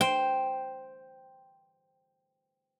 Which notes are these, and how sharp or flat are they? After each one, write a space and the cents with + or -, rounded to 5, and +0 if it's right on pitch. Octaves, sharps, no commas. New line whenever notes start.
C5 +0 G5 +0